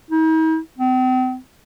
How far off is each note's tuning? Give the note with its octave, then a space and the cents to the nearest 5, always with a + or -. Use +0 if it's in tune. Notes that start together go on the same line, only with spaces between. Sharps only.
D#4 +45
C4 -40